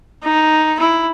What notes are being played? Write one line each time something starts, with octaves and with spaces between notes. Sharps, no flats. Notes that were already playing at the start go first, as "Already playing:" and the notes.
D#4
E4